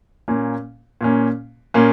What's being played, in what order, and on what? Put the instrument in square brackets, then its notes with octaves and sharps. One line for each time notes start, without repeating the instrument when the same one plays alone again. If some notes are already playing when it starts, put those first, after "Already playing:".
[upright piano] A#2 A#3 C#4
A#2 A#3 C#4
A#2 A#3 C#4